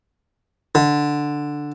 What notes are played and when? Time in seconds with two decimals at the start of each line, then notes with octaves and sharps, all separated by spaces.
0.75 D3